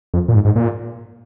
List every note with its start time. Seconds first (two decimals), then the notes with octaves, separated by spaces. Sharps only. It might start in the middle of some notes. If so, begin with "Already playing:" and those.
0.14 F2
0.28 A#2
0.35 G#2
0.45 G#2
0.56 A#2